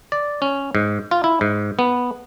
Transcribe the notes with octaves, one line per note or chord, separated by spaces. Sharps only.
D5
C#4
G#2
F4
E4
G#2
B3